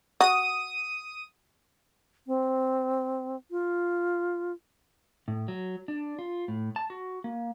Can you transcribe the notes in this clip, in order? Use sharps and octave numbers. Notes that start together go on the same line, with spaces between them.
F#4 D#6 D#7
C4
F4
A2
F#3
D4
F4
A2
A5
F#4
A#3